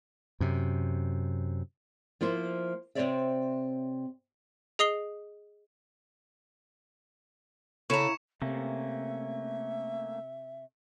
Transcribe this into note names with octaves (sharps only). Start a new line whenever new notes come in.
F#2 C3
F3 A#3 E4 C5
C3 A#3 C4 C#5 D5 E5
G#4 D#5 D#6 C7 G7
C#3 C#4 E4 A4 A#5 C#6 C#7 E7
C3 A3 A#3 C#4 E5